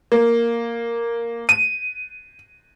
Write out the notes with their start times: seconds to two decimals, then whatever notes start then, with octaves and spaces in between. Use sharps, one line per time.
0.12 A#3
1.49 D#7